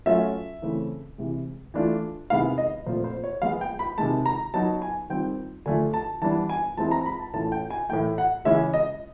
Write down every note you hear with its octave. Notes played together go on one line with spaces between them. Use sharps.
F#3 A3 C#4 F4 E5
C#3 E3 A3 C4
C3 E3 G#3
E3 A3 D4 F4
C3 D#3 G#3 B3 E4 F5
D#5
A#2 F3 A3 C4 F4 C5
C5
C#5
F3 G#3 B3 F5
G5
B5
C3 D#3 G#3 A5
A#5
F#3 B3 D#4 A5
G#5
D#3 G3 C4 F4 G5
D3 F3 A3 D4 F4 G#5
A5
E3 G3 B3 D4 A5
G#5
E3 G#3 C4 E4 A5
A#5
B5
A5
A2 E3 A3 C#4 F4 A5
G5
G#5
A2 E3 A3 G5
F#5
C#3 E3 G#3 C#4 E4 E5
D#5